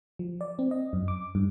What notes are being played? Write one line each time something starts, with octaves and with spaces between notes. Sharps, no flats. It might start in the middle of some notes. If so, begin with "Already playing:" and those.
F3
D5
C4
D#5
F#2
D6
G2